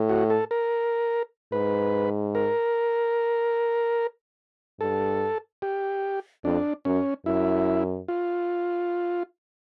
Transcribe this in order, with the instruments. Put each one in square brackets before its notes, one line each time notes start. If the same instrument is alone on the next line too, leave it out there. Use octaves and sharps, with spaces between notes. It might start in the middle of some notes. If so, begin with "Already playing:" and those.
Already playing: [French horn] A2
[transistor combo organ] F#4
A4
A#4
[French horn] G#2 [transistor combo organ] B4
[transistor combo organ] A#4
[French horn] G2 [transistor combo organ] A4
[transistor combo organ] G4
[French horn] F2 [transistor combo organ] D4
[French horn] F#2 [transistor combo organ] C#4
[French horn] F#2 [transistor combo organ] E4
[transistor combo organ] F4